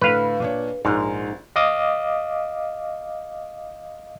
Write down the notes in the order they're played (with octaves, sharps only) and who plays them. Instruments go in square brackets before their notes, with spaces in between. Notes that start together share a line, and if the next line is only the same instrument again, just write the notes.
[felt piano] A2 D3 [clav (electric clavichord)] B4 F5
[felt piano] A#2 D4 C#5
[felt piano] A#1 A#4 C6 [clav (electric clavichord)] G#2
[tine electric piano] D#5 F5 D6 D#6